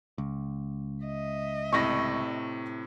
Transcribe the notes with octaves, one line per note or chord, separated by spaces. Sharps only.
C#2
D#5 E5
A2 C3 C#6 A#6